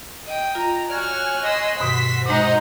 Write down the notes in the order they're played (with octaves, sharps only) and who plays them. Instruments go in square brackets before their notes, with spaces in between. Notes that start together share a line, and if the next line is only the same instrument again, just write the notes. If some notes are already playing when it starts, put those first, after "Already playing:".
[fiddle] D#5 G5
[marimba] F4 [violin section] A#5
[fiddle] F#4 F6 [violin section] C#5 G#5 F#6 [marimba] D5 G#6
[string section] D#5 [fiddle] C6 E6
[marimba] G2 B2 D#3 [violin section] F#4 [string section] B6
[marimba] A#2 G#3 [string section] D#4 C5 [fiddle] F#5 D#6